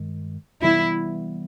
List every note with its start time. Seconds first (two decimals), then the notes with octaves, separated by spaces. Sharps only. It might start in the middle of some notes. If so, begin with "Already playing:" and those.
Already playing: G2 D#3 G#3
0.63 C3 E3 G3 B3 E4